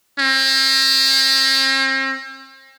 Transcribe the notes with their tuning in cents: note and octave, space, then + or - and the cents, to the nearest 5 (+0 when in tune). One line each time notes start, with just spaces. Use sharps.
C4 +40